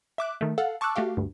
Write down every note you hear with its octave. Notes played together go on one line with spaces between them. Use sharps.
E5 D6 F#6
D#3 A3
A4 F5 F#5
A5 C#6 D6 E6 F#6
A3 F#4 G4 F5
D2 G2